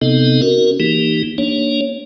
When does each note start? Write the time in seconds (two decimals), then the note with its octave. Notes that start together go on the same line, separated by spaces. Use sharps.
0.01 C3 B3 C4 D#4 A4 D#5
0.42 C#4 F#4 A#4
0.80 E3 A#3 D#4 G4
1.38 A#3 D4 C#5